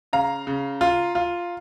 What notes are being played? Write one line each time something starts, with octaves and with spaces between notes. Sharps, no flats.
C#3 F5 A#5
C#3
F4
F4